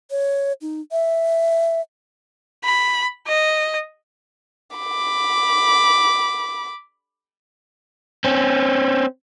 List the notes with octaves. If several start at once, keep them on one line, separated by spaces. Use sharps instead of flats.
C#5
D#4
E5
B5
D#5
B5 D6
C4 C#4